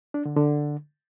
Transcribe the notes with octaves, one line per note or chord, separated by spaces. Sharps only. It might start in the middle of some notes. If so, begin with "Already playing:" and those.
D4
D3
D3